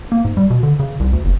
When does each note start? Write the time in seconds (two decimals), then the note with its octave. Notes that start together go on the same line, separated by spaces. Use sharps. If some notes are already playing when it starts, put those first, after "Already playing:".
0.12 A#3
0.25 G#2
0.37 G3
0.50 B2
0.63 D3
0.79 C#3
1.00 C2
1.13 D2
1.25 F#1